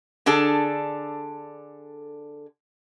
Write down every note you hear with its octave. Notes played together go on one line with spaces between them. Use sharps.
D3 D4 G#4 A4